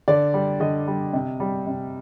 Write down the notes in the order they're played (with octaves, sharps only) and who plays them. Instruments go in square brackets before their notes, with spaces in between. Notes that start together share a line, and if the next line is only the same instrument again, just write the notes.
[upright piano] D3 D5
G3
D3 D#5
G3
C3
G3
C3